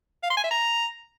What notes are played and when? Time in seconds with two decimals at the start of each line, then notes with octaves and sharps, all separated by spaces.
0.23 F5
0.30 C6
0.37 G#5
0.44 E5
0.51 A#5